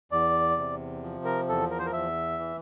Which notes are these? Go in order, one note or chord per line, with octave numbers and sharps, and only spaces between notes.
E2 D5
C3
F3
A#4
E2 A4
A#4
C5
A#4
E2 E5
E3